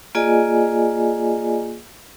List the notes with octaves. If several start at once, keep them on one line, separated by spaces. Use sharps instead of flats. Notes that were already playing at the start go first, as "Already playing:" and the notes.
A#3 F4 G#4 D5 D#5 G#5